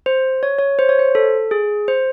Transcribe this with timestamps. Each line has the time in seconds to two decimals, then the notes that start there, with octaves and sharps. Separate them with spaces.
0.06 C5
0.43 C#5
0.58 C#5
0.79 C5
0.89 C#5
0.99 C5
1.15 A4
1.51 G#4
1.88 C5